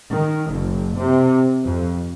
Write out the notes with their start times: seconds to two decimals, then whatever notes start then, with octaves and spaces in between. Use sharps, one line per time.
0.11 D#3
0.52 F#1
0.96 C3
1.64 F2